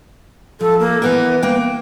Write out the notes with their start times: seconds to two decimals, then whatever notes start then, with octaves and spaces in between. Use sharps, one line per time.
0.61 F3 A4
0.79 A#3
1.02 E3 B3 A#4 B4
1.43 A#3 G5